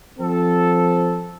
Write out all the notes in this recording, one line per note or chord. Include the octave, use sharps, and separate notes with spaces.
F3 C4 A4